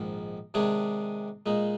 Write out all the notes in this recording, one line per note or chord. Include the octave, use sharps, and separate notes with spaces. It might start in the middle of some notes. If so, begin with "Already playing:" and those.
Already playing: A#1 G#2 D#3
C3 D#3 G#3 D4 G#4
A#2 G#3 D#4